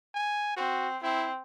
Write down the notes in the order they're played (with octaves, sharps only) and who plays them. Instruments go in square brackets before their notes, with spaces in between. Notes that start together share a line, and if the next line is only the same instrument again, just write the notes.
[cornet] G#5
[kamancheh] C4 [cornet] F#4
[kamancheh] C4 [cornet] E4